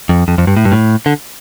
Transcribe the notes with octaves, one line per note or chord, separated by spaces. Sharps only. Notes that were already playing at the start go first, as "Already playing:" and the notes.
F2
F2
F2
G2
A2
G2
A2
D3